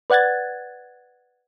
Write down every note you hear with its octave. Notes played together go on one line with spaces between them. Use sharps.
B4 D5 F#5 F#6 G#6 A6